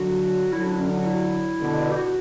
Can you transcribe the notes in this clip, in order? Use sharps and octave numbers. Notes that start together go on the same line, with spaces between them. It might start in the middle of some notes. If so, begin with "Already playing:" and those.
Already playing: D3 F#3 F#4
D3 F#3 E4
D4
C#4
D4
F#4
E4
B2 D3
G4
F#4